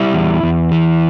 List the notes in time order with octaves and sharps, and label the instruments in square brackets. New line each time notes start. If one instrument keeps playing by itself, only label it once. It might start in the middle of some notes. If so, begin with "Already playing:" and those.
Already playing: [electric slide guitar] G3 E4
E2
E2
E3